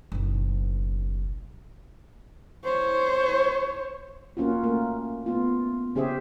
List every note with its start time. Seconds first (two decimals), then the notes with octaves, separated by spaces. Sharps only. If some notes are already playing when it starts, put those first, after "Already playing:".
0.12 F#1 B1
2.65 C5 C#5
4.37 A#3 C#4 F4 F#4
4.63 A3 A#3
5.26 A3 B3 F4
5.95 C#3 C#4 G4 G#4 C5 E5